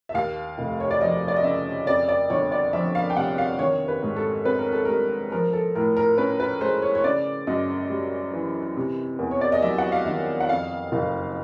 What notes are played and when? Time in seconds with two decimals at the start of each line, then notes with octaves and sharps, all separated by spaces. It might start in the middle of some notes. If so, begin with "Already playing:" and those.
0.09 E5
0.14 D#2 F5
0.58 F1
0.80 C#5
0.90 D5
1.01 F3 D#5
1.28 D5
1.37 D#5
1.44 C#3 E5
1.87 F2 D5
2.08 D5
2.30 G1 C#5
2.52 D5
2.73 F3 E5
2.95 F5
3.10 G5
3.16 C3 F#5
3.38 F5
3.59 D#3 C#5
3.88 B4
4.03 G#2
4.17 A4
4.45 C4 B4
4.59 A#4
4.72 A4
4.85 G3 A#4
5.32 F3 A#4
5.53 A4
5.75 A2 A#4
5.97 A#4
6.18 C#4 B4
6.40 B4
6.61 G#3 C5
6.82 C#5
6.95 C#5
7.04 C#3 D5
7.47 F#2 D#5
7.90 G3
8.33 E3
8.76 C3
9.19 E2
9.31 C#5
9.41 D5
9.52 D#5
9.62 F#3 E5
9.78 F#5
9.92 F5
10.05 D#3 E5
10.41 F#5
10.49 F2 F5
10.92 F#1